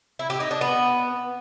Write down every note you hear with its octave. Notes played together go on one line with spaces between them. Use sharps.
E4
G4
D#4
D4
B3